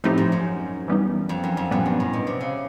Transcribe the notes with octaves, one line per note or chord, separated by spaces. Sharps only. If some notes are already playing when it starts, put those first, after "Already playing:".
A2 F3 A3 C4 D#4 G4
G#2
F#2
E3 G3 B3 D#4
F2
F#2
F2
F#2 A#2 G3 B3
G2
A2
B2
C3
C#3